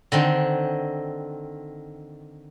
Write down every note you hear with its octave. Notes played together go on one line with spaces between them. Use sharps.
D3 D#3 C4